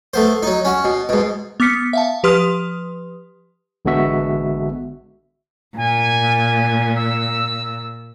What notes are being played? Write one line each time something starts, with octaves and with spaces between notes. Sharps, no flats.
A3 B3 C5
F#3 D#4
C#4 F#4
B2
G#2 B2
B3 D6 F6 B6 C#7
E5 F5 A5
F3 G4 B4 C6 D#6 F6
A1 D3 G#3 B3 F#4 E5
A#2 G#5
E6